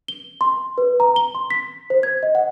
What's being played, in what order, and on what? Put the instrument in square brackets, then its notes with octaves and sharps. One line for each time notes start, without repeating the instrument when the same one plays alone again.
[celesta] G7
C6
B4
A#5
G7
C6
B6
C5
G#6
D#5
F#5